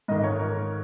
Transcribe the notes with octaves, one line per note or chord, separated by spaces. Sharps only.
G#2 D#3 D#5
C#5
A#4